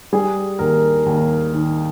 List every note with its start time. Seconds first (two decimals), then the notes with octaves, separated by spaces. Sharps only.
0.13 G3 G#4
0.59 D#2 A#4
1.06 D#2
1.53 D#3